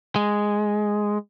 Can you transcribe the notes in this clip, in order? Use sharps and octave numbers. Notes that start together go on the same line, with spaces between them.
G#3